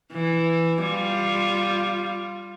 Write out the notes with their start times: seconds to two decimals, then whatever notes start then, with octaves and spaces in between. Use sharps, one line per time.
0.13 E3
0.83 G3 F4